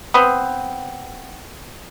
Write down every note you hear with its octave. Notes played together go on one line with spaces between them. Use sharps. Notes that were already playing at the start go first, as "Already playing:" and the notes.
B3 C4